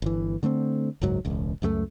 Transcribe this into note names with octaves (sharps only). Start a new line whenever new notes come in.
G1 E3
D3 A3 B3 C4
F#1 C#2 G#2 F#3
E1 C#2
C#2 F#2 G3 A3